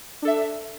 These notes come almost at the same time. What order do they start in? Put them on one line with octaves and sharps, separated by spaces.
D4 A4 E5